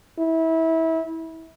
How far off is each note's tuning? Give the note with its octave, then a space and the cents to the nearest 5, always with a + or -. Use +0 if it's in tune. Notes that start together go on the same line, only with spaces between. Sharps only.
E4 -25